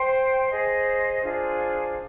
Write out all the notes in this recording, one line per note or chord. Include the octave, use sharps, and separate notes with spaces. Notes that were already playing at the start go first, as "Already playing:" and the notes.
Already playing: C5 G5 C6
G#4 C5 D#5
D4 F4 G#4 C5